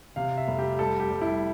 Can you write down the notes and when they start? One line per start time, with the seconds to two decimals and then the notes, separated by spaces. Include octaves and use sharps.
0.16 C3 F5
0.37 E5
0.48 F1
0.59 G4
0.79 G3 A4
1.00 G4
1.11 G3
1.21 E4